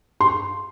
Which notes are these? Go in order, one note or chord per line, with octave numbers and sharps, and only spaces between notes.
C6